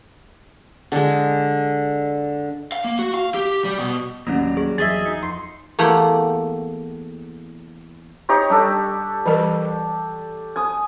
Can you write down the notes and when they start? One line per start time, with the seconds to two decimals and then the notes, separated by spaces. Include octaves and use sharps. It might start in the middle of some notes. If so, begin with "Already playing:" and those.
0.92 D3 G#3
2.72 F5
2.84 A#3
2.99 F#4
3.14 F5
3.34 G4
3.64 G3
3.79 B2
4.27 A1 D#2 F#3 G3 A#3 C#4 D4
4.57 G#4
4.78 F#1 E2 G#4 D#5 E5 A6
5.06 D#4
5.23 F2 C6
5.79 E2 A3 A#3 G4 F#5 G5
8.29 D#4 G4 C#5
8.50 G3 D4 A4
9.26 E3 G3 A#4
10.56 G#5 D#6